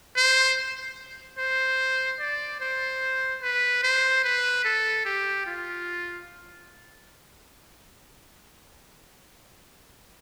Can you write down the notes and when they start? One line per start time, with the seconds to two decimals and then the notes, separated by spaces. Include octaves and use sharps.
0.17 C5
1.38 C5
2.20 D5
2.61 C5
3.42 B4
3.83 C5
4.24 B4
4.65 A4
5.05 G4
5.46 F4